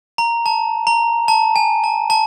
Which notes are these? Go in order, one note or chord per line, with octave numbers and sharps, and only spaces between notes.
A#5
A5
A#5
A5
G#5
A5
A5